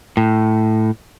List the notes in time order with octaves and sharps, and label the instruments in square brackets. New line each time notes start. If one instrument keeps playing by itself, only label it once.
[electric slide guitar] A2